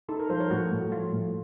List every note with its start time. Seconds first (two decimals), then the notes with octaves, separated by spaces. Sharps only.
0.08 D#4 A4
0.19 A#4
0.30 F3 C5
0.40 A#4 C#5
0.50 A2 F#4
0.71 A2
0.92 F3 F4
1.12 A2